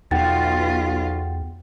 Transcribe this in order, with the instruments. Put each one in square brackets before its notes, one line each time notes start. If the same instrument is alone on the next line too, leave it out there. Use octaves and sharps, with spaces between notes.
[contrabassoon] B1 [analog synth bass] E2 [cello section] B2 F4 [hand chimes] F#5 G5 A6